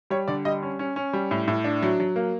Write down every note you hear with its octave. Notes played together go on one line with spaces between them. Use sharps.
G3 C#5
D3 D5
G3 D#5
C#4
C#4
C#4
G3
A2
A2
D4
F#3
F#3
A#3